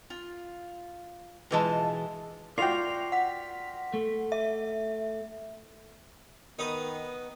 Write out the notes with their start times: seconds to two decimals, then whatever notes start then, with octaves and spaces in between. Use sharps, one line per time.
0.10 F4
1.51 B2 E3 G#3 F4 E5 A5
2.58 F4 F#4 A#4 D5 G5 C7 F7
3.12 F#5 B6
3.94 A3
4.32 E5
6.59 D#3 B3 D#4 B4 D#5